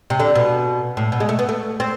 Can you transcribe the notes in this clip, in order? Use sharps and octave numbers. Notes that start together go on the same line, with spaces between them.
C3
D3
B2
A2
B2
G#3
A3
B3
A3
C4